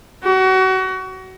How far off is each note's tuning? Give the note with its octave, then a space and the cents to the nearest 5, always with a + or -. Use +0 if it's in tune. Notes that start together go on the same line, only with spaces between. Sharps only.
F#4 +30